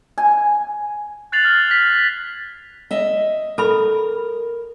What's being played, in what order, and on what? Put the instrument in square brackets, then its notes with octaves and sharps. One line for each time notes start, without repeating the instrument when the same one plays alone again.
[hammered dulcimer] G#5
[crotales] F#6 G#6 A6 C7 F7 F#7
F6 A6
B6
[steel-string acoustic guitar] D#5 E5
[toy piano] A4 B5 [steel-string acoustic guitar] A#4